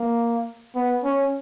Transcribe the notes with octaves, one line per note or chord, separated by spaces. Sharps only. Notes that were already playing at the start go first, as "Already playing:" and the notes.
Already playing: A#3
B3
C#4